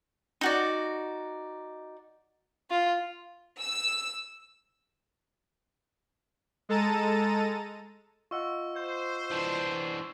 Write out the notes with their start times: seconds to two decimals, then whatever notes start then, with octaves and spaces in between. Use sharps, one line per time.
0.41 D#4 F#4 D5
2.70 F4
3.60 E6
6.69 G#3 A4 A5 A#5 A6 D#7
8.31 F4 D#5 F#5 C#6 E6
8.76 C5 G6
9.31 E3 D4